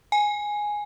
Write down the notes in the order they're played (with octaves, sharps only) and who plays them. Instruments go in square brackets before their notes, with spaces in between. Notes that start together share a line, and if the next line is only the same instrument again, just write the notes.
[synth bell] G#5